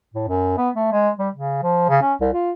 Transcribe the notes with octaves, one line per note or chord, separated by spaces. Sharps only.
A2
F#2
B3
A3
G#3
G3
C#3
F3
C#3
C#4
C2
F4